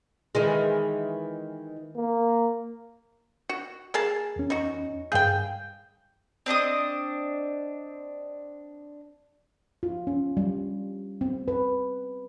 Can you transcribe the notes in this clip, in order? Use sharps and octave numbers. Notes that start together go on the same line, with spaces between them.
D#3 E3 G#3
A#3
F#4
A#3 G#4 A5
E2 C#4
D#4 F#4
G2 G#4 F5 G5 G6
C4 D4 D#5 D#6
F4
C#4
G3
C4
B4